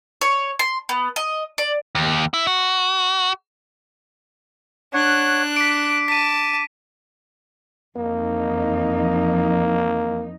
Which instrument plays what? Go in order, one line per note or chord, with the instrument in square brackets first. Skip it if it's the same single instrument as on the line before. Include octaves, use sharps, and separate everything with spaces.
[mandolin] C#5
C6
B3
D#5
D5
[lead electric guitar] D#2
E4
F#4
[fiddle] D4 F#6 [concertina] C#5 F#5
[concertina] D6 [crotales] B6 D7
[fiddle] A5 [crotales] B6 D#7
[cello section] F2 E3 D#4 [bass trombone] A#3